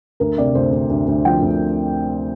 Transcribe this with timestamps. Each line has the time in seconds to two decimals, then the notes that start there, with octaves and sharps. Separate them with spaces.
0.20 D2 A#4
0.38 C3 D5
0.55 D2 C5
0.72 D2
0.90 D2
1.08 D2
1.24 F3 G5
1.42 D2